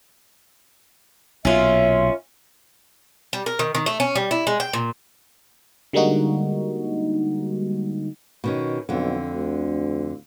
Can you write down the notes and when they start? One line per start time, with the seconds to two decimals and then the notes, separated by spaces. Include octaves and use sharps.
1.45 B1 A#2 C#4 F4 E5
3.33 G3
3.46 A#4
3.59 D#3
3.75 D#3
3.86 A3
4.00 C#4
4.15 G3
4.31 E4
4.47 G#3
4.60 G5
4.73 A#2
5.93 D3 G3 G#3 A#3 D#4 F#4
8.44 B2 D#3 C#4
8.89 B1 F2 D3
9.33 D2